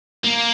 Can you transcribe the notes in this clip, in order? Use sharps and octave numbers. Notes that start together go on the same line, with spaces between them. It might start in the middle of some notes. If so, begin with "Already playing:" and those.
A#3